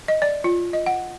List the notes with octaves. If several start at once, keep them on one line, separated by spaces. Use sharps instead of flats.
D#5
D5
F4
D#5
F#5